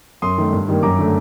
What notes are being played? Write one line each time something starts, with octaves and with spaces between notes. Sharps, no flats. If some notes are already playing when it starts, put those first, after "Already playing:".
F#2 C6 D#6
D#3 A3
G2
D#3 G3 A#3
F#2 A#5 D6
D3 A3